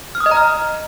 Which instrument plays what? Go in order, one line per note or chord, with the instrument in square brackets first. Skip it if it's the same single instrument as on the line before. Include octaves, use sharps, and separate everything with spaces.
[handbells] F6
D#6
D#5
A#5
F6